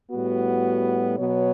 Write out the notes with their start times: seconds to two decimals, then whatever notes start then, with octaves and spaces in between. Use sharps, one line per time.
0.11 A2 G3 B3 F#4
1.18 B2 F#3 B3 C#5